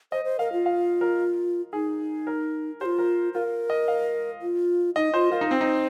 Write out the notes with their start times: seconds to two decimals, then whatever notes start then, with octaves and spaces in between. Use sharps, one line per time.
0.12 C5 D#5
0.25 C5
0.39 A#4 F5
0.52 F4
0.66 F5
1.01 A#4
1.73 D#4 G#4
2.27 A#4
2.81 G4 C5
2.86 F4
2.98 A#4
3.34 F4 A#4
3.70 D#5
3.88 F5
4.42 F4
4.96 D#4 D#5
5.13 F4 C5
5.31 F4 A#4
5.41 D#4
5.49 C4 C5
5.61 D#4